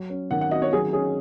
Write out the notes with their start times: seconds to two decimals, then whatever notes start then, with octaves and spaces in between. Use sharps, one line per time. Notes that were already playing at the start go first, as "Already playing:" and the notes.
Already playing: F#3
0.10 C#4
0.31 D#3 F#5
0.41 F#5
0.51 F#4 D#5
0.62 C#5
0.73 F#3 G#4
0.93 C#4 G#4